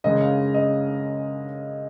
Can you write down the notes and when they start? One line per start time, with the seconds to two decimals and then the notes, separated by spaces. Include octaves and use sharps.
0.04 F#2 C#3 G#3 D#5
0.21 F5
0.54 D#5